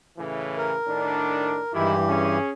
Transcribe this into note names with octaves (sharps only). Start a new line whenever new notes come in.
A2 C#3 E3
A#4
A2 D#3 D4
G2 D#3 E3 G#3 E4 G4
C#4 G#4